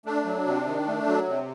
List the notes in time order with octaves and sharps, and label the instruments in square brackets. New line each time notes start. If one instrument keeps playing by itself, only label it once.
[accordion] A3 D4
F#3
C3
D#3
A3
F#3
C3